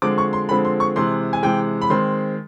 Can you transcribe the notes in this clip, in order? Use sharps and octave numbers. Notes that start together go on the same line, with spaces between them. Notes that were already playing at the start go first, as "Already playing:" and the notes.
D3 F3 G#3 C4 D6
C#6
C6
D3 F3 G#3 C4 B5
C6
C#6
C3 E3 G#3 C6
G#5
C3 E3 G#3 G5
B5
D#3 G#3 C4 C6